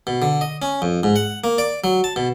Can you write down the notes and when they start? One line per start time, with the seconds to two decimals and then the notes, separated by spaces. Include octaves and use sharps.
0.07 B2
0.22 D3
0.41 D#5
0.62 C#4
0.82 F2
1.03 G#2
1.16 F#5
1.44 A#3
1.58 D5
1.84 F#3
2.04 A5
2.16 B2